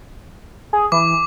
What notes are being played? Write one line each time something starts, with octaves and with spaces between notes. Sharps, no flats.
G#4
E3 D6